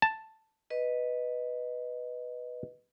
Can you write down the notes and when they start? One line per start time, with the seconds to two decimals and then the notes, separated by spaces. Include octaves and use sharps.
0.02 A5
0.70 B4 D#5